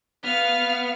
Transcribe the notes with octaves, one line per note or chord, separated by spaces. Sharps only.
B3 F5 F6